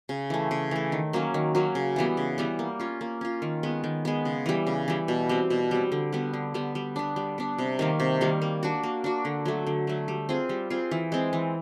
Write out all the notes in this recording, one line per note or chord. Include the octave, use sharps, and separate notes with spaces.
C#3
E3 A3
C#3
E3 A3
D#3
F#3 A#3 C#4
D#3
F#3 A#3 C#4
C#3
E3 G3 B3
C#3
E3 G3 B3
A#3
C#4 F4
A#3
C#4 F4
D#3
G#3 B3
D#3
G#3 B3
C#3
E3 G3
C#3
E3 G3
B2
G3 C4
B2
G3 C4
D3
G3 B3
D3
G3 B3
G3
B3 D4
G3
B3 D4
C3
D#3 G3 A#3
C3
D#3 G3 A#3
A#3
D4 F#4
A#3
D4 F#4
D3
F#3 A3
D3
F#3 A3
G3
C4 F4 G#4
G3
C4 F4 G#4
E3
G#3 C4
E3